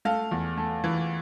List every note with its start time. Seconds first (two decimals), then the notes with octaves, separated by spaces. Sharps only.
0.05 A3 F5
0.31 E2
0.57 A3
0.84 E3